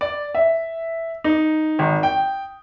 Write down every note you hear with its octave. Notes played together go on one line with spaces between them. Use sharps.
D5
E5
D#4
G#1
G5